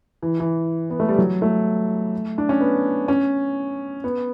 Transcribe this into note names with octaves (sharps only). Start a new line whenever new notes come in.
E3
E3
B3
A3
G3
F#3
A3
D4
C#4
B3
C#4
B3